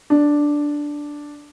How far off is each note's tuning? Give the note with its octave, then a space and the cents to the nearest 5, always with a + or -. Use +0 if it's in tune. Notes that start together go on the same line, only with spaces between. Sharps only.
D4 +0